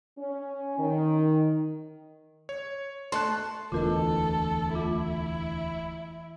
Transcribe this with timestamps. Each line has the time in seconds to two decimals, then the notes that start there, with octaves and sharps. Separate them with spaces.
0.18 C#4
0.77 D#3
2.49 C#5
3.12 A3 A5 C6 F#6
3.72 E1 D2 B2 E3 F4 A4 A#4 D#5
4.75 A3 E4 F4